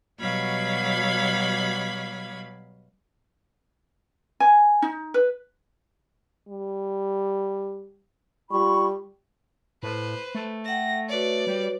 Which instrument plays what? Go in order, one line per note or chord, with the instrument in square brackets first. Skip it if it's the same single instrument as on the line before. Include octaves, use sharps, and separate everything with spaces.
[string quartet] B2 F#3 G3 F5 B5 G#6
[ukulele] G#5
D#4
B4
[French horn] G3
[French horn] G3 [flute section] F4 B5 C#6
[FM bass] A2 [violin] B4 C5
[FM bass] A3
[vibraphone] E5 F#5 G5 [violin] A#6
[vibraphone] F#4 B4 C#5 [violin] D5
[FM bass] G3